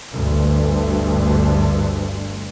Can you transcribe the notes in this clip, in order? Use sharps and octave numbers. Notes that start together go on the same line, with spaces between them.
G1 D2 G2